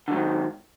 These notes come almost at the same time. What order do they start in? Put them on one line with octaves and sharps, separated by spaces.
D3 F#3 G#2 D#3